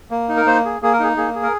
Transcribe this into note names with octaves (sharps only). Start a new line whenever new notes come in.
A#3
D#4
A#4
A#3 C5
G#4
A#3 G#4
A#4
D#4 G#4
A#3 G#4
G#4
A#4